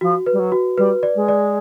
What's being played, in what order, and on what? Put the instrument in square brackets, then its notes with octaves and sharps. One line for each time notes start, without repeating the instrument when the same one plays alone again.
[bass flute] F3 [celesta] F#4
[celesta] B4
[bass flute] G3
F#3
[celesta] F#4
[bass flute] G3 [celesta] B4
[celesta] D5
[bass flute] G#3
[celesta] D5